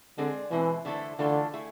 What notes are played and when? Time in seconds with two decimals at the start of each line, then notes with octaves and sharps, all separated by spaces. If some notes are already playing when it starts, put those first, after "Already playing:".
0.18 D3 G#3 C4 G#4 D5
0.51 B2 E3 G#3 C4
0.85 D3 A3 E4 A4 C5
1.19 D3 E3 A3 D4 F4 A4
1.54 A3 E4 G#4